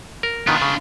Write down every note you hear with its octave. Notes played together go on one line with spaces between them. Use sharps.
A#4
B2 D#3 B3 D4 F4
C#3